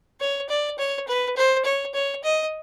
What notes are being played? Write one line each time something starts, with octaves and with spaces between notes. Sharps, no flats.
C#5
D5
C#5
B4
C5
C#5
C#5
D#5